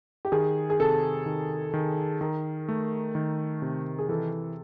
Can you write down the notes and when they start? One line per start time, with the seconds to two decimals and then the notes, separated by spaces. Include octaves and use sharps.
0.25 G4
0.32 D#3 G#4
0.70 G#4
0.80 C3 A4
1.26 D#3
1.73 D#3
2.21 D#3 A#4
2.68 A3
3.15 D#3
3.62 C3
3.98 G#4
4.09 E3 A4